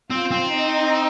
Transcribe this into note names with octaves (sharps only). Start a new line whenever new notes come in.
C4 F4
C4
D#4